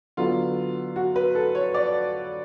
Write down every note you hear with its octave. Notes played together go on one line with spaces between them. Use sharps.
D3 F#3 B3 F4
F#4
B4
A4
C#5
D5